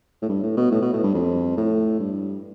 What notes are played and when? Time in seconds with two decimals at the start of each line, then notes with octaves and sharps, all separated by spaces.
0.22 A2
0.29 G2
0.43 A2
0.57 B2
0.72 A2
0.82 B2
0.93 A2
1.03 G2
1.14 F2
1.57 A2
2.00 G2